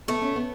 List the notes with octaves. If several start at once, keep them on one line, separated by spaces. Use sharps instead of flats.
A3 B3
C#4
B3